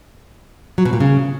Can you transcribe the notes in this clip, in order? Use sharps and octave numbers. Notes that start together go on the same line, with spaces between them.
F#3
B2
A#2
C#3